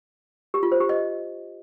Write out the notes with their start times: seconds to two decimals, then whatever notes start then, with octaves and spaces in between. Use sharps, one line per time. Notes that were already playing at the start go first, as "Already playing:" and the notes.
0.54 G4
0.63 F4
0.72 C5
0.80 G4
0.89 D#5